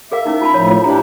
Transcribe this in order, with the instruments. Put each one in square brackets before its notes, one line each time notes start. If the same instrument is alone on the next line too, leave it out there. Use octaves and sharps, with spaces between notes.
[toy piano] G#4 A#4 F5 [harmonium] E5
[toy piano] C#4 D#4 E4
F4 A5 B5
[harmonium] A2 F3 [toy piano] C#5
[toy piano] F4 C#5
[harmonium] D4 E4 G4 [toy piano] A#5